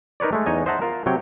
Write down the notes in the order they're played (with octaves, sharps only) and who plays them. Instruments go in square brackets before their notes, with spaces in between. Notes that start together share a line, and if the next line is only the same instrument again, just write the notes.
[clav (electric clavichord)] D#4 A#4 B4 C#5 D5
G#3 A3
E2 D#4 C#5 D#5 G#5
C5 D#5 E5 F#5 A5 A#5
F4 A#4
C3 F#3 C#5 G5